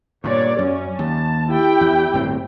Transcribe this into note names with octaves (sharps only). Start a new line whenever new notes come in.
G2 A#2 C#5 D5
F#2 C#4
D#2 A5
E4 G4 G5
E2
D1 G1 C4